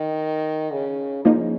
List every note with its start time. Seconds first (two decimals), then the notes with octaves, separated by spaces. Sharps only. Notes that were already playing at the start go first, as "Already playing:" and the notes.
Already playing: D#3
0.71 C#3
1.24 C#3 F3 A#3 D#4